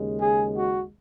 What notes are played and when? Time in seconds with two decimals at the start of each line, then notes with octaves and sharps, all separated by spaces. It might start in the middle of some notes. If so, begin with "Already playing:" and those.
Already playing: D#2 C#3 G#3
0.19 G#4
0.56 F#4